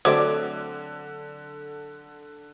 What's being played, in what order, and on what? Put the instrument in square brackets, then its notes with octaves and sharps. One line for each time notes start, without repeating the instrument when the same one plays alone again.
[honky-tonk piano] D3 [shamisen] F#3 A3 C4 [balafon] C5 [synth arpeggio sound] D5 D6